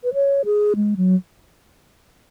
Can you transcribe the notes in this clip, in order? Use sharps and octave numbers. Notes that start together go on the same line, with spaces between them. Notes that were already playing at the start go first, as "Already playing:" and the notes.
B4
C#5
G#4
G#3
F#3